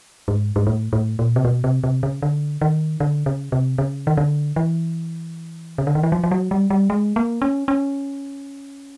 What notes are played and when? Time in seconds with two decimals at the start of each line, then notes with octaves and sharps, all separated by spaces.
0.28 G#2
0.56 G#2
0.67 A2
0.93 A2
1.19 A#2
1.36 C3
1.45 B2
1.64 C3
1.84 C3
2.03 C#3
2.22 D3
2.61 D#3
3.00 D3
3.26 C#3
3.52 C3
3.78 C#3
4.07 D#3
4.17 D3
4.56 E3
5.78 C#3
5.87 D3
5.95 D#3
6.03 E3
6.12 F3
6.24 F3
6.31 F#3
6.51 G3
6.70 G3
6.90 G#3
7.16 A#3
7.42 C#4
7.68 C#4